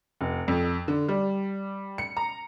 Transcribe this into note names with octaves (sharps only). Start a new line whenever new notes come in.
F1
F2
D3
G3
C#7
A#5